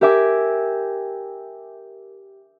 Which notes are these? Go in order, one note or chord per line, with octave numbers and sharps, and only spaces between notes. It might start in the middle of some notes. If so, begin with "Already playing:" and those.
G4 A#4 E5 G#5 D6